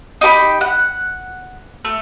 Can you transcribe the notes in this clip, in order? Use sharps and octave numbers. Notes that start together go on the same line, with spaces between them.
D#4 G4 A#5 B5
F#5
A3